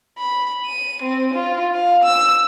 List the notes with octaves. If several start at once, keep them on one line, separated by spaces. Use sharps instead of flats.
B5
D#7
C4
F4
F5
E6